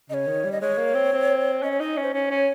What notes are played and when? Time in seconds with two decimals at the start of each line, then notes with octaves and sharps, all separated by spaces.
0.10 C#3 C#5 D#5
0.27 D#3
0.44 G3
0.52 D#5
0.61 G#3 C#5
0.78 A#3
0.95 C4
1.13 C4
1.62 C#4 D#5
1.72 C#5
1.80 D#4 D#5
1.97 C#4
2.03 C5
2.14 C#4 C#5
2.31 C#4